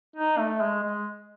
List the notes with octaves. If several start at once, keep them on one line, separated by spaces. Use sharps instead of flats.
D#4
A3
G#3
G#3